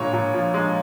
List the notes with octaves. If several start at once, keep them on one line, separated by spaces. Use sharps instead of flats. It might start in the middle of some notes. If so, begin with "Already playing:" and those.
Already playing: A#2 G#3 C#5
A#2
F3
G#3